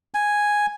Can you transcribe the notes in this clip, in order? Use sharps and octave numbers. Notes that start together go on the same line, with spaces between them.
G#5